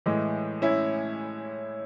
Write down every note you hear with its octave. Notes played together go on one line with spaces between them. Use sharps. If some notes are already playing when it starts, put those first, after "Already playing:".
A2 E3 G#3
C#4 E4